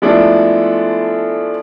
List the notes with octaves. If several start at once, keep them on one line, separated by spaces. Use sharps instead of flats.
F3 G#3 A3 B3 D4 E4